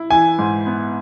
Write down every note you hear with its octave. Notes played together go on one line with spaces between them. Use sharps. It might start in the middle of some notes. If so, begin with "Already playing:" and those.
Already playing: E4
E3 G#5
G#2
B3